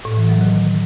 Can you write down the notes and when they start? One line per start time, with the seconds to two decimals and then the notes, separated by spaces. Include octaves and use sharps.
0.05 A2
0.17 E3
0.29 F#3
0.41 D#3